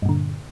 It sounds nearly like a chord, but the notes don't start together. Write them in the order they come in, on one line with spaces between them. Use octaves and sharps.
G2 A#2 D3